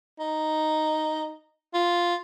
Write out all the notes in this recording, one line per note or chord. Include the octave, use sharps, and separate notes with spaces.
D#4
F4